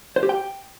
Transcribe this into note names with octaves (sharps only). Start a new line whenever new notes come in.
C5
G4
G5